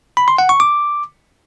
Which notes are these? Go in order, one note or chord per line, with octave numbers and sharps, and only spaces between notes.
B5
C6
F#5
C#6
D6